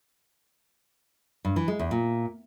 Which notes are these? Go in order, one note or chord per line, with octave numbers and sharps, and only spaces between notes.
G2
E3
G#3
E2
A#2